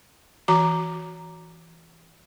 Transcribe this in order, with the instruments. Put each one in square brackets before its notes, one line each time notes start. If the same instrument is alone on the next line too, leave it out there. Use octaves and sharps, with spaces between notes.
[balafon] E3 F#4 A#5 D6